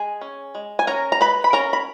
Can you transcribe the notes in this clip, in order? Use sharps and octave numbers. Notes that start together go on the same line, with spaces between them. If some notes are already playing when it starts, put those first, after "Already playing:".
Already playing: G#3 G#4 G#5
C#4
G#3
G#5
C#4 A#4 A#5
A#5
G#3 B4 B5
B5
C#4 A#4 A#5
B5